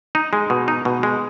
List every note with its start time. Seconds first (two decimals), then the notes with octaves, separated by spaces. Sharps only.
0.15 D#4
0.33 G#3
0.50 B2
0.68 D#4
0.85 B2
1.03 G#3